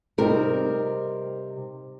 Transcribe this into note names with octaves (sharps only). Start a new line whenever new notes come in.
C3 G3 D#4 A#4